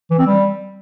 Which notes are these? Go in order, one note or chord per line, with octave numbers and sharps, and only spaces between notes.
E3
C4
G3